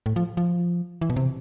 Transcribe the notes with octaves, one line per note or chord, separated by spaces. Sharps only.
A2
F3
F3
E3
B2
C3